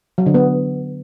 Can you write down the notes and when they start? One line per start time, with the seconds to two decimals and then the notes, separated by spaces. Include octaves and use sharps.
0.18 F#3
0.26 D3
0.34 B3